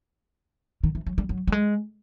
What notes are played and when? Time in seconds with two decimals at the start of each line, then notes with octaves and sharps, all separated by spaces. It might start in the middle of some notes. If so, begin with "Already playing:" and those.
0.84 D#3
0.95 E3
1.07 F#3
1.18 G3
1.29 F#3
1.47 G3
1.52 G#3